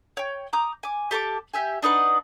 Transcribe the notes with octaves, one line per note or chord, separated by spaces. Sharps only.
C#5 G5
A#5 D6 D#6 G6
G#5 D6
G4 A4 A5 D6
G4 E5 G#5
D4 D#4 B4 F#5